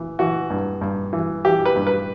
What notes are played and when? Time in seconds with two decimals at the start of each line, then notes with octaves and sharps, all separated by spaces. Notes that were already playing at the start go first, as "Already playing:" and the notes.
Already playing: E3
0.19 E3 F#4
0.50 G2
0.81 G2
1.13 E3
1.45 E3 G4
1.65 B4
1.76 G2
1.87 B4